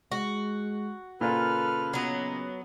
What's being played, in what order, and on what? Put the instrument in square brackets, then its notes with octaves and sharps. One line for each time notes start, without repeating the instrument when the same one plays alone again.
[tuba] G#3 [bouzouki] F#4
[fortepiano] A#2 F4 [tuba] C#3 [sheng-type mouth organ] A4 B4 F6
[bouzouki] F#3 B3 [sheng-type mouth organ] D#5